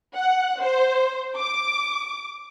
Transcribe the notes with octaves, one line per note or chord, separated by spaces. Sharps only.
F#5
C5
D6